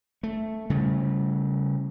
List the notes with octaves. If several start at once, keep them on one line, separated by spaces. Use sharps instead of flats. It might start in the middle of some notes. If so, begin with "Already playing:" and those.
A3
C#3 G3 A3